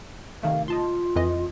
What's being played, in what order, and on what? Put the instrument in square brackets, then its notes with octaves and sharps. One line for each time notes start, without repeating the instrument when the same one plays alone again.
[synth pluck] C3 D#3 A3 [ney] F5
[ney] F4 [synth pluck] D#5 A5 C6
[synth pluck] F2 E3 D#5